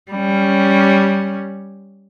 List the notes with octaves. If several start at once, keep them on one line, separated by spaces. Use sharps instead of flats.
G3 C#4